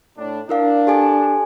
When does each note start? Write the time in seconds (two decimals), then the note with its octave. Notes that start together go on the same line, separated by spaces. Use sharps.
0.18 A2 D4
0.49 D4 E4 A#4 F5
0.87 G4 A4 G#5